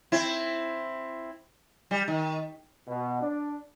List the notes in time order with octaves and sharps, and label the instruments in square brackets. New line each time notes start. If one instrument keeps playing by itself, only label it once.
[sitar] C4 E4
G3
D#3
[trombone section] B2
D4